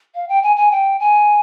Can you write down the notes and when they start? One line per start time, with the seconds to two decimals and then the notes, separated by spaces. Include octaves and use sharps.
0.15 F5
0.29 G5
0.43 G#5
0.56 G#5
0.71 G5
1.00 G#5